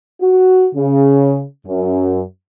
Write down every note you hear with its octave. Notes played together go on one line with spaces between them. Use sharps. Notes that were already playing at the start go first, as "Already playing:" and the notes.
F#4
C#3
F#2